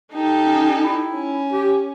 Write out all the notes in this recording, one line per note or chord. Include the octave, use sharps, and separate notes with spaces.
D#4 G4 A4
C#4
E4
C#4
G4